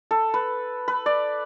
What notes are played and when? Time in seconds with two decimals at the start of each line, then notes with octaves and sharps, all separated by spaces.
0.11 A4
0.34 B4
0.88 B4
1.06 D5